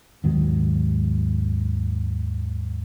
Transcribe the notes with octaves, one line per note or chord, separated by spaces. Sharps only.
D#2 G#2 D#3 F#3